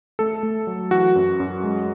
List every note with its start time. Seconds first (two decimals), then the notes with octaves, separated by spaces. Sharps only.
0.19 A3 A4
0.43 A3
0.67 F#3
0.91 E3 F#4
1.16 F#2
1.40 F#2
1.64 G#3